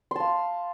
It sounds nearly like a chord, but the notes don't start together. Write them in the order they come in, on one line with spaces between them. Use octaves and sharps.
C6 A5 F5